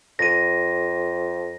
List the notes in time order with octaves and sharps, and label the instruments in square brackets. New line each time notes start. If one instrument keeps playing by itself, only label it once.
[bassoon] F2 [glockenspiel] A#6 D#7